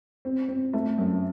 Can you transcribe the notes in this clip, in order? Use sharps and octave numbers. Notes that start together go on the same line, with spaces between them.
C4
C4
A3
F#2